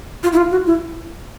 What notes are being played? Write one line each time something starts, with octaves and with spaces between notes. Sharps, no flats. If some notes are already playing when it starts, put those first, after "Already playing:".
F4
E4
F4
F#4
E4